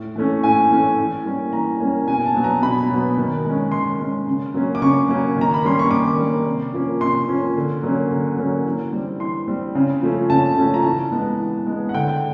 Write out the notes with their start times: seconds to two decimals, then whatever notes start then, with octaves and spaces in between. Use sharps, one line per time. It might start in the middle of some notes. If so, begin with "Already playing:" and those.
Already playing: A2
0.16 E3 A3 C#4
0.44 A2 G#5
0.71 E3 A3 C#4
0.98 E3
1.25 G3 A#3 C#4
1.53 E3 A#5
1.80 G3 A#3 C#4
2.07 B2 G#5
2.26 A5
2.35 F#3 B3
2.44 A#5
2.62 B2 B5
2.90 F#3 B3
3.18 D#3
3.45 G#3 C#4
3.72 D#3 C6
4.00 G#3 C#4
4.27 C#3
4.54 F#3 A#3 C#4
4.75 D6
4.82 C#3 C#6
5.09 F#3 A#3 C#4
5.37 D#3 A#5
5.54 B5
5.64 G3 A#3 C#4 C6
5.79 C#6
5.91 D#3 D6
6.19 G3 A#3 C#4
6.46 C3
6.74 F3 A#3 C#4
7.01 C3 C6
7.29 F3 A#3 C#4
7.56 D3
7.83 F#3 A#3 C#4
8.11 D3
8.38 F#3 A#3 C#4
8.65 E3
8.93 G3 C4
9.20 E3 C6
9.48 G3 C4
9.75 C#3
10.02 F3 A3 C#4
10.30 C#3 A5
10.58 F3 A3 C#4
10.74 A#5
10.84 E3 A5
11.12 G#3 B3
11.39 E3
11.67 G#3 B3
11.89 F#5
11.94 D3 G5